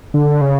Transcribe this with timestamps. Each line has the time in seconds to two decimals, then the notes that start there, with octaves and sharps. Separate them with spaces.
0.14 D3
0.41 C#3